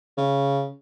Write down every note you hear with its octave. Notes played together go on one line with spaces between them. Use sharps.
C#3